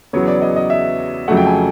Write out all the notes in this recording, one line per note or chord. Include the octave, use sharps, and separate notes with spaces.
E2 C#3 F#3 B3 C#5
D5
D#5
D#5
E5
F2 C#3 F#3 A3 F#5
G5
G#5